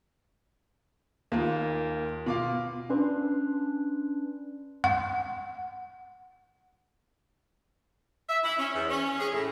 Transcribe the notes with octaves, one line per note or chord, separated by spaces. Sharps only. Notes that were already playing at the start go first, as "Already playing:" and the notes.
D#2 A#3 F4
B2 F4 F5 D6
C#4 D4 B4 C6
F#5
E5
E4
C#4
E2
C#4
G#4
A2